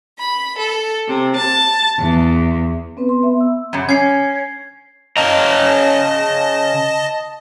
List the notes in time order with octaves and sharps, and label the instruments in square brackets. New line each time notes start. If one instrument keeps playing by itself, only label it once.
[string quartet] B5
A4
C3
A5
E2
[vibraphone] B3 C4 B4
C6
B3 E5
E6
[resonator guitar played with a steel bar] F#2 C#3
[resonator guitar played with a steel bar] C#4 [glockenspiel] G#6 C7
[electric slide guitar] C#3 F5 A#5 [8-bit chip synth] D#5 A5